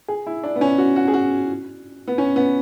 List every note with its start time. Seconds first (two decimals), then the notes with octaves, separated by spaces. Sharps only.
0.08 G#4
0.27 E4
0.44 D4
0.56 B3
0.61 C#4
0.78 F#4
0.96 F#4
1.08 G#4
1.14 F#4
2.08 B3
2.18 C#4
2.36 B3